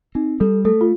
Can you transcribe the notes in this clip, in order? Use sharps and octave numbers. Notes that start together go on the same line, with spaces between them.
C4 D#4
G3 A4
A3 A4
F4